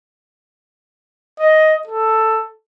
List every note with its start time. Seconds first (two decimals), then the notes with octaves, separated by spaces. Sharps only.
1.39 D#5
1.87 A4